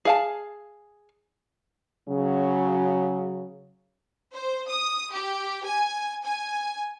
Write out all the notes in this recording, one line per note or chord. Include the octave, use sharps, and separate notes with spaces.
G#4 F5 A5
C#3 F#3
C5
D#6
G4
G#5
G#5